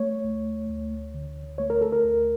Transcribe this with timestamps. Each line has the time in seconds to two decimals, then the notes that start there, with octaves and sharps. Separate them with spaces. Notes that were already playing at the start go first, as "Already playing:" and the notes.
Already playing: A3 C#5
0.24 D2
0.70 D2
1.14 D3
1.58 A3 C#5
1.70 A#4
1.81 A4
1.92 A#4
2.04 D2